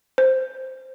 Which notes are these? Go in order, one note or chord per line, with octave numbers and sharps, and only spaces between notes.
C5